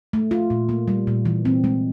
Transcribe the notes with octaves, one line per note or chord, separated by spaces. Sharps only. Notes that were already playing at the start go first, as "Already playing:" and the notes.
A3
F4
A#2
A#3
G3
A#2
E3
C4
G#3